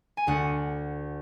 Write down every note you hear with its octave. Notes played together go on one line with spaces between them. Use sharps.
G#5
D2 D3 F#5